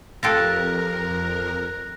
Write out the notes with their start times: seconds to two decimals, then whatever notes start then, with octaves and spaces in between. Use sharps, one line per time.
0.23 F2 F4 G4 A4 A#4 F#6 A#6